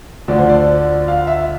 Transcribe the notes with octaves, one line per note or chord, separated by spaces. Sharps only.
D2 D3 F3 D5
C5
D5
F5
E5